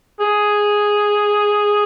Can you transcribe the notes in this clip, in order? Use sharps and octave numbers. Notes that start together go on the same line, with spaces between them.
G#4